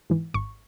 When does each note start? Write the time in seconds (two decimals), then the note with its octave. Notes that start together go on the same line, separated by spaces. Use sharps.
0.10 G#2 E3
0.34 G#1 C#6